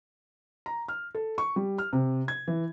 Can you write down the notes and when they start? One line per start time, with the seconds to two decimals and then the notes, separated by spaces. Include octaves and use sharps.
0.66 A#5
0.88 F6
1.15 A4
1.38 C#6
1.56 G3
1.78 F6
1.93 C3
2.28 G#6
2.48 E3